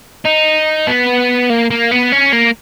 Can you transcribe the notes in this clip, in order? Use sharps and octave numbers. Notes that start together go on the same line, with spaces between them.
D#4
B3
A#3
A#3
B3
C#4
A#3